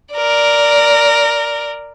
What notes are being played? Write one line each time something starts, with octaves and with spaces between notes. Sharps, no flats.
A#4 D5